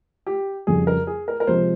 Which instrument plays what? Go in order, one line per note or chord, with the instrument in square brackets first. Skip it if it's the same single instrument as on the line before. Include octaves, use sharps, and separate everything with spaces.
[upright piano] G4
[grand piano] F2 C#3 G3 [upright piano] G#4
[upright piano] A#4
G#4
A#4
A#4
[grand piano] C3 F3 G#3 [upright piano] C5